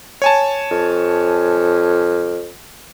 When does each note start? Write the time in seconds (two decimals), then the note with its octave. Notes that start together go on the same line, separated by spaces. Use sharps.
0.22 C#5 G#5 A5
0.71 F2